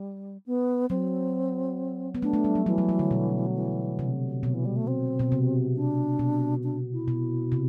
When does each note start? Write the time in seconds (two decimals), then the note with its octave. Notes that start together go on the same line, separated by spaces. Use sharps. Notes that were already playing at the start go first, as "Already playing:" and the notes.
Already playing: G3
0.46 B3
0.90 F#3 C4
2.15 B3
2.22 A3 D4
2.33 A3
2.44 G3
2.55 F#3
2.66 E3 F#3
2.78 F#3
2.89 F#3
2.99 D3
3.11 B2
3.55 E3
3.99 C3
4.43 B2 F#3
4.54 E3
4.65 G3
4.76 A3
4.87 C4
5.19 B2
5.32 C3
5.75 D4
6.19 B2
6.63 D4
6.93 E4
7.08 B2
7.52 C3